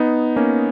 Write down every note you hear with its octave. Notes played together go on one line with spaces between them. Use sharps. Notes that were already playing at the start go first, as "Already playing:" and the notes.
Already playing: B3 D#4
A#3 C#4